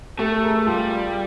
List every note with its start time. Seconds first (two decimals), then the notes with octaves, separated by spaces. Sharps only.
0.19 A3 G4 A4
0.31 A4
0.43 G#4 A#4
0.66 G3 F4 G4
0.90 F4